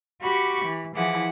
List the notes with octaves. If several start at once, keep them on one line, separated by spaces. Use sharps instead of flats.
F#4 G4 B5 C#6 D6
E3
E3 F3 E4 G#4 F#5 D6